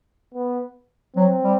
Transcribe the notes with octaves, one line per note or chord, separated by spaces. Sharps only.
B3
F#3 C4
G3